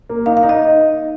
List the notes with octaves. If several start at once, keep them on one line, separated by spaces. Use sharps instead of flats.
A#3
D#4 F5
F5
D#4
D#5